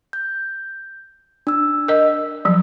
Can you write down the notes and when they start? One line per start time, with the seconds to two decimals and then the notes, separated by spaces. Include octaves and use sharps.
0.13 G6
1.47 D4 E6
1.88 A#4 D#5
2.45 F3 F#3